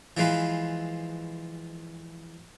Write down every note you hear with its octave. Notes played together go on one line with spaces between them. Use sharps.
E3 F3 G#3 F4 B4